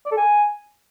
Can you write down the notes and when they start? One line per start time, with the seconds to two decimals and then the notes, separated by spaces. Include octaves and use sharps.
0.06 D5
0.12 A4
0.17 G#5